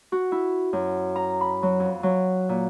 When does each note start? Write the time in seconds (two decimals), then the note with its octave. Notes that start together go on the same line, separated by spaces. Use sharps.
0.12 F#4
0.32 E4
0.73 F#2
1.16 A#5
1.41 B5
1.63 F#3
1.80 F2
2.03 F#3
2.49 A#2